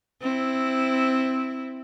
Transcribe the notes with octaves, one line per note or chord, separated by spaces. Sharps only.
C4 E4